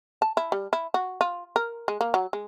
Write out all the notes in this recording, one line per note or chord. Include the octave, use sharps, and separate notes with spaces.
A5
E4
G3
E4
F#4
F4
A#4
G#3
A#3
F#3
G#3